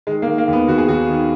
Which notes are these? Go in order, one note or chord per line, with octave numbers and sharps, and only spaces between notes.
D#3 G#3
A#3
D#3
A#3
D#2
B3
D#2 F#4
G#4
D#2 F#4
D#3